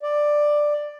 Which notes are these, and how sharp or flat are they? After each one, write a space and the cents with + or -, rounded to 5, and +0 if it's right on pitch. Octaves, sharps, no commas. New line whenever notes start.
D5 +10